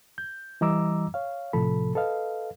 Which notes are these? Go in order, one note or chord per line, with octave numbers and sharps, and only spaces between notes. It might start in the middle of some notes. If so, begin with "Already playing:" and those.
G6
E3 G3 D#5 A#5 D6 E6
C#5 F5
A2 C3 F3 A4 B5
A4 B4 D#5 F5